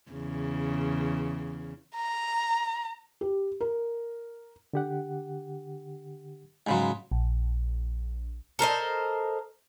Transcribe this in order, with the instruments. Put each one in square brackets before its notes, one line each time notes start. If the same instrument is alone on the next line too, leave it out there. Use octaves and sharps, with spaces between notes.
[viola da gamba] E2 C#3
[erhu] A#5
[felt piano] G4
A#4
[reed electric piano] D3 G4 F#5
[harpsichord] G#2 C#3 F#3 [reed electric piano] G#5 B5 C6
[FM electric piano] A#1
[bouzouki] A4 A#4 C5 D#5